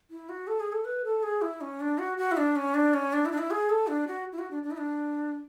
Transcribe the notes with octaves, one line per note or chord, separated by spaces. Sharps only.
E4
F#4
A4
G#4
A4
B4
A4
G#4
E4
C#4
D4
F#4
F#4
E4
D4
C#4
D4
C#4
D4
E4
D4
E4
G#4
A4
D4
F#4
E4
F#4
D4
D4
E4
D4